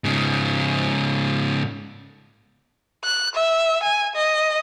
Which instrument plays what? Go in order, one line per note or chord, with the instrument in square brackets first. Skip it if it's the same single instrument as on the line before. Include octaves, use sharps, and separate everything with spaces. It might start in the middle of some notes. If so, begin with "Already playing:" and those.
[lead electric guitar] G#2 C#3
[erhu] F#6
E5
G#5
D#5